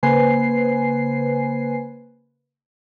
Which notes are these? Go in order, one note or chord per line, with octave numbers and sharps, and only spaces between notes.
C#3 A#3 B4 C5 G#5 C7